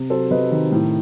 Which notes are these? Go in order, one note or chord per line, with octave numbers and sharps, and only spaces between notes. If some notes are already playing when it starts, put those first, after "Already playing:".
Already playing: C3
F#3 A4 C5
C3 B4 D#5
D#3
A2